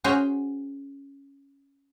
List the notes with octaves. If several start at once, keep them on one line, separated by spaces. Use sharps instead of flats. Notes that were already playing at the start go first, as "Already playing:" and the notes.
C#4 F#4 G#4 C5 C#5